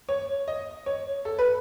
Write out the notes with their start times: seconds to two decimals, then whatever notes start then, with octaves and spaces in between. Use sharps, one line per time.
0.09 C#5
0.48 D#5
0.86 C#5
1.25 A4
1.39 B4